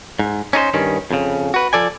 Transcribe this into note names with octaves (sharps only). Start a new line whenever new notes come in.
G#2
C#4 D#4 G#4 C5
G2 D#3 C#4
F2 C#3
F#4 B4
F3 A4 D5 G#5